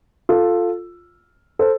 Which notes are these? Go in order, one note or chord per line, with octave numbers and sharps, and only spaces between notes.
F4 A4
A4 C5